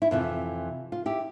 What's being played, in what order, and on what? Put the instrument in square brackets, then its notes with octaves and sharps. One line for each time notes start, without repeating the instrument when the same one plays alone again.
[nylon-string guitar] E4
F2 C3 E3 F4
F4
E4 G4